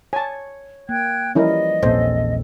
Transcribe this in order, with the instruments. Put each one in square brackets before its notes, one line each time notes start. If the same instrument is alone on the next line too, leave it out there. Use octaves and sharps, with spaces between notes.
[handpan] C#5 [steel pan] G#5 A5
[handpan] A#3 [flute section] G5 F#6 G#6
[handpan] E3 F3 G3 [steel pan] C#4 E4 A#4 [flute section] D#5
[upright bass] A#1 E2 [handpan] C4 C#4 A4 [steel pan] C5